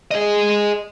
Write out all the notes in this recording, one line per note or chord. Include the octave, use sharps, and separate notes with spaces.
G#4 D#5